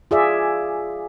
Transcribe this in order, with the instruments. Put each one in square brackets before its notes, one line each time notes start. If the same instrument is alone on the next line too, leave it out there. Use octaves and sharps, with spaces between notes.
[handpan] F4 G#4 D5 E5